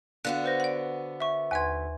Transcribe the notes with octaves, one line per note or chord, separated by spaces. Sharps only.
D3 B3 F#4 F5 F#6
B4 C5 A#6
D5 F#5
E5 C#6
D#2 B4 G#5 C6 G#6